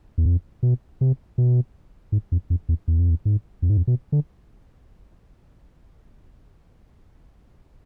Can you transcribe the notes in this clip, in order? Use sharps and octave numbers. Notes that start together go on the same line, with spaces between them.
E2
F2
B2
C3
B2
G#2
F2
F2
E2
E2
F2
E2
G#2
F2
G#2
F2
B2
D3